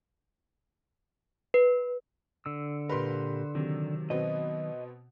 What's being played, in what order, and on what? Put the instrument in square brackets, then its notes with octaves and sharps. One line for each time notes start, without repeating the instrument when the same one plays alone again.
[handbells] B4
[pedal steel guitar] D3 E6
[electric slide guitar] A#2 G4 A#4 [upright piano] B4 C6
[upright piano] C3 [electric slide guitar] D#3 F#3
[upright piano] B2 B3 C4 [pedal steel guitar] D#5